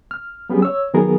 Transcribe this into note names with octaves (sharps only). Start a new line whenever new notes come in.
F6
F#3 G3 B3 C#4 G4 G#4
C#5 E6
D#3 F#3 B3 F#4 G#4 A#4